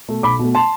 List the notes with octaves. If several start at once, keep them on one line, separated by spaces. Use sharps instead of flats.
B2 A3
B1 B5 D6
B2 A3
A5 C6